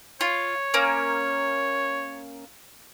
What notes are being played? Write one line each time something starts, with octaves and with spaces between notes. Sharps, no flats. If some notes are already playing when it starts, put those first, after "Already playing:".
F4 C#5
A#3 C#4